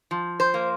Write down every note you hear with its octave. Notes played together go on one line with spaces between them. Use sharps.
F3
C5
A#3